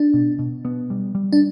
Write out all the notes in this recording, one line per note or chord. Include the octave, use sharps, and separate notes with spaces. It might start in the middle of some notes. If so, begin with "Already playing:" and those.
Already playing: D4
B2
B2
B3
G3
G3
D4